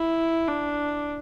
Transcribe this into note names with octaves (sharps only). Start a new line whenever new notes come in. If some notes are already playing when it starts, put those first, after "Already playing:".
Already playing: E4
D4